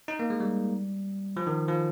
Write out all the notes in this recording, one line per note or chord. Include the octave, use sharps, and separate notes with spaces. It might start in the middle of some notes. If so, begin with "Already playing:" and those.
D#4
A#3
G#3
G3
F3
D#3
F3